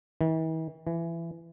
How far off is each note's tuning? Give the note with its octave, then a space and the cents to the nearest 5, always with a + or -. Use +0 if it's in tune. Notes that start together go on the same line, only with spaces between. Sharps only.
E3 -45
E3 +20